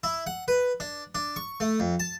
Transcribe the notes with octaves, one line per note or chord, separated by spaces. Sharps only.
E4
F#5
B4
D4
D4
C#6
A3
F2
A5